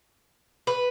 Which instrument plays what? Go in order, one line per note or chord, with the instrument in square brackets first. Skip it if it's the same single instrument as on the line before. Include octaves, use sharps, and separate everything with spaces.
[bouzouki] B4